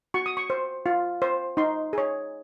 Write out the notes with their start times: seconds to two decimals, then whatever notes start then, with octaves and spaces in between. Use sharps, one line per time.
0.14 F#4 C#6
0.26 D#6
0.37 C#6
0.50 C5
0.86 F4
1.22 C5
1.57 D#4 C6
1.93 G#4 C#5